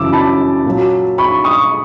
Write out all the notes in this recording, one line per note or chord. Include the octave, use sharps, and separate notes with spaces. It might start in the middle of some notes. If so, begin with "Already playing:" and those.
Already playing: F#2 C#3 E3 D6 E6
A5 B5
A#2 F#3
B5 C#6
C#6 D#6